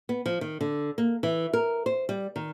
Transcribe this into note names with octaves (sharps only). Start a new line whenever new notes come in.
B3
F3
D#3
D3
A#3
E3
A#4
C5
G3
D#3